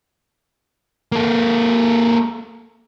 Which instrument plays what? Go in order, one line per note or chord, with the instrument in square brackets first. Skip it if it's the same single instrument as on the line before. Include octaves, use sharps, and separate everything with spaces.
[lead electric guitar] A#3 A4